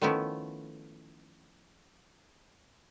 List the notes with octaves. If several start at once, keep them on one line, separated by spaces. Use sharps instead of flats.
D#3 F3 A3 B3 C#4 E4